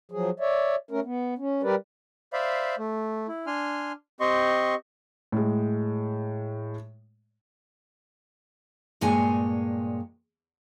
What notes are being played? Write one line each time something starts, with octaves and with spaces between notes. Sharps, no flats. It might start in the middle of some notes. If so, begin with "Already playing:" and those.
F3 F#3 G#4
C#5 D5 E5
A3 C#4 A#4
B3
C#4
G3 G4 A#4 B4 D5
C5 D5 E5 F5 B5
A3
E4
D4 G#5 C6 F6
C4 G4 D#5 C6 C#6
A2 G#3
G2 A#2 G#3 C#5 G#5